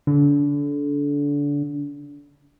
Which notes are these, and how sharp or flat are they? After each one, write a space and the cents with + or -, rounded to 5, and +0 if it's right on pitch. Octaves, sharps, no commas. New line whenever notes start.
D3 -30